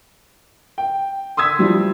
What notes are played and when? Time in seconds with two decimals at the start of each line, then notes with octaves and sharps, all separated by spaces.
0.78 G5
1.37 C6 D#6 E6 G#6 B6
1.59 E3 F3 G3